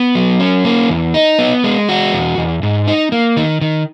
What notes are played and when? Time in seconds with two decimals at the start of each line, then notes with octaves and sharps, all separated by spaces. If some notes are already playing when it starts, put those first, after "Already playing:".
Already playing: B3
0.15 F#3
0.40 C#4
0.65 A#3
0.89 E2
1.14 D#4
1.39 B3
1.64 G#3
1.89 F#4
2.13 E2
2.38 E2
2.63 G#2
2.87 D#4
3.12 A#3
3.37 D#3
3.61 D#3